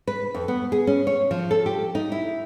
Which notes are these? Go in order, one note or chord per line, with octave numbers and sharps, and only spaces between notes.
B4
F2
B3
G#4
C#4
C#5
F3
A4
G4
D#4
E4